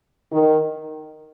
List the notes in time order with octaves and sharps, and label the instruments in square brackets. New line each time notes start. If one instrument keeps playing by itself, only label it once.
[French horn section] D#3